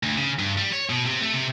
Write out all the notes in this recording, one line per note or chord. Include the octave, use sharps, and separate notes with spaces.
D2
C#3
G2
G3
C#5
B2
C3
A3
C3